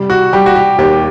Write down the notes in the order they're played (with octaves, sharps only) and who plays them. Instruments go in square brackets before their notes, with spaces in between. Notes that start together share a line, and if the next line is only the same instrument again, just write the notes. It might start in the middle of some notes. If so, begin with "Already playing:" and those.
Already playing: [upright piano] C3 G3
[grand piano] F#4
[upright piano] G3 [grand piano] G4
[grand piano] F#4
G4
[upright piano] D#2 [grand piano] G4